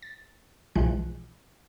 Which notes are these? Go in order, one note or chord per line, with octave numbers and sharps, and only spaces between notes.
A6
B1 E3 F3 G#3 F#6